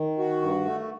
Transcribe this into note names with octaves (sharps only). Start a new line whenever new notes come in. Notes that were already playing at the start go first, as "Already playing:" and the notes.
Already playing: D#3
F#4
G2
A3